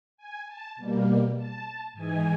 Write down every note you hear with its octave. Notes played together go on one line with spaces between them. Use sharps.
G#5
A5
B2 G3 A#3
A5
G#2 E3 G#3 G#5